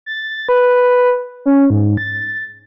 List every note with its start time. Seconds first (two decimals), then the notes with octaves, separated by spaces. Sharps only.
0.06 A6
0.49 B4
1.46 C#4
1.70 G#2
1.97 A6